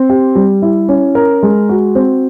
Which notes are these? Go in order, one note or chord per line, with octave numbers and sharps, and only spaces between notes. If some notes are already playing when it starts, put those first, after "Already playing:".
Already playing: C4
G4
G3
E4
C#4
A#4
G#3
F#4
C4